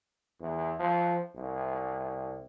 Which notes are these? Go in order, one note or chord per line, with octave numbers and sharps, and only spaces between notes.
E2
F3
C2